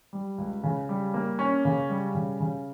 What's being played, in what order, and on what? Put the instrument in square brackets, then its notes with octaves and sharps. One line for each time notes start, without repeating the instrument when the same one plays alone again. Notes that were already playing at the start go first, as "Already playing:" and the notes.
[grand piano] G3
C#2
C#3
G3
A#3
C#4
C#3
G3
C#3
C#3